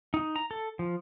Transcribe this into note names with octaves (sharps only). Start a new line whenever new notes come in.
D#4
A#5
A4
F3